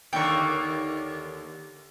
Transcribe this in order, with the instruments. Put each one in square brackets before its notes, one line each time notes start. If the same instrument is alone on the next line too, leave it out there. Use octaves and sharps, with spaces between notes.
[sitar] D#2 D3 A#3 [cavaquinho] G5 C#6